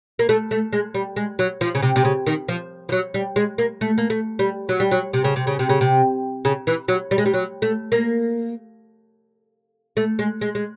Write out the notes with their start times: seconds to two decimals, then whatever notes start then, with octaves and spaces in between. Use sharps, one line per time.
0.19 A#3
0.29 A3
0.51 A3
0.73 G#3
0.94 G3
1.16 G#3
1.39 F#3
1.61 F3
1.75 C#3
1.82 C3
1.96 C3
2.05 C#3
2.27 D#3
2.49 F3
2.89 F3
2.92 F#3
3.14 G3
3.36 G#3
3.58 A#3
3.81 A3
3.98 A#3
4.10 A3
4.39 G3
4.69 F#3
4.80 G3
4.91 F#3
5.13 C3
5.24 C#3
5.36 C3
5.47 C#3
5.59 C3
5.69 C#3
5.81 C3
6.45 C#3
6.67 E3
6.88 F#3
7.11 G3
7.18 G#3
7.26 G3
7.34 F#3
7.62 A3
7.92 A#3
9.97 A3
10.19 G#3
10.41 G#3
10.55 G#3